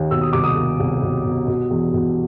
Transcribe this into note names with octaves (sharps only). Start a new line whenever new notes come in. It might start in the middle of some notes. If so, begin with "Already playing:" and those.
Already playing: D#2
B2 E6
D#6
C2 D6
D#6
B2
C2
B2
B2
B2
E2
B2